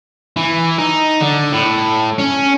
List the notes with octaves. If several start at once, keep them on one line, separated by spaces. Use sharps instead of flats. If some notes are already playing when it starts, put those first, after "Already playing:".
E3
D#4
D3
A2
C#4